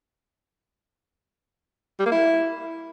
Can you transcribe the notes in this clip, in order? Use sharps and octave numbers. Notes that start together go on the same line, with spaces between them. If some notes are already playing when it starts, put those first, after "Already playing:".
G3
A#3
E4